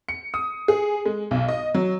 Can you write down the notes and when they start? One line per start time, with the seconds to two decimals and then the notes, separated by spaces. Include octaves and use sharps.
0.09 C#7
0.34 D#6
0.68 G#4
1.06 G#3
1.31 B1
1.49 D#5
1.74 F#3